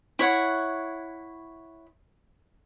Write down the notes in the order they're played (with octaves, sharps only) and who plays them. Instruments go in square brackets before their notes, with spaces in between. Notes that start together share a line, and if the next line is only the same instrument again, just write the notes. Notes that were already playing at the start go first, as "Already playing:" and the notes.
[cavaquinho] E4 C#5 F#5